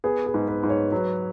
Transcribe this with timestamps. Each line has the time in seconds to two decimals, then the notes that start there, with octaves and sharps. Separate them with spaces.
0.04 B3 G#4
0.26 G#4
0.34 G#2
0.48 B4
0.63 G#2
0.70 C#5
0.92 F#3 B4